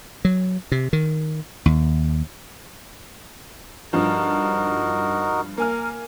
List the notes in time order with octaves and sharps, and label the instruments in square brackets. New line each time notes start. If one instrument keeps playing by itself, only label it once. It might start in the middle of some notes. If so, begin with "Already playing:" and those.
[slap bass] F#3
C3
D#3
D#2
[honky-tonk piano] G2 F3 [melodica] D#4 F#4 A#4
[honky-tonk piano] A#3 G#5 F6 [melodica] A#4